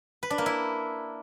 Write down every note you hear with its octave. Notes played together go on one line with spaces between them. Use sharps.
B4
D4
A#3
E4